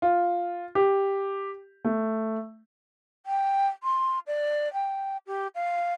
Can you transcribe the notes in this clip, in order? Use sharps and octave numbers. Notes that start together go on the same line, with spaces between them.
F4
G4
A3
G5
C6
D5
G5
G4
F5